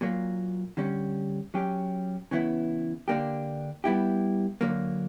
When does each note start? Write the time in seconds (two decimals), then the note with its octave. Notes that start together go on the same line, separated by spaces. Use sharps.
0.01 A#2 F#3 A#3
0.77 D3 G3 C#4
1.54 F#3 C#4 G4
2.31 C#3 E3 B3 E4
3.08 D3 A#3 D4 G4
3.84 G3 B3 E4 G4
4.61 D3 F#3 A#3